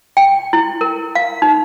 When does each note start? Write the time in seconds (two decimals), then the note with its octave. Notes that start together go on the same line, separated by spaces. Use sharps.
0.17 G5
0.53 E4
0.81 A#4
1.15 F5
1.42 D#4